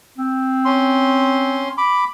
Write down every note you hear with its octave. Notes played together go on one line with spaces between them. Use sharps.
C4
C#4 C6
B5 D6